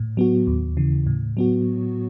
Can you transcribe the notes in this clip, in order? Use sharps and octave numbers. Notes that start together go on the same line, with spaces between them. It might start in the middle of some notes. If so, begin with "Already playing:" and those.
Already playing: A2
F#3 B3 F#4
D#2
C#3 E3
A2
F#3 B3 F#4